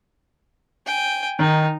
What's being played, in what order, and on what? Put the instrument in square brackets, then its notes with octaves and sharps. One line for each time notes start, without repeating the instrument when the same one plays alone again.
[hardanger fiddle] G5 G#5
[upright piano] D#3 [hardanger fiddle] D#4